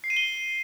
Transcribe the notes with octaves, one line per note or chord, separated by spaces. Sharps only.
C7
D#7
G7